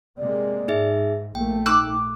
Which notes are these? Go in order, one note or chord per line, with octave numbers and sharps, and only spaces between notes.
C3 G#3 A#3 D5
G#2 D#4 G#4 E5
A#1 A3 A#3 G5
D#4 D6 E6 F#6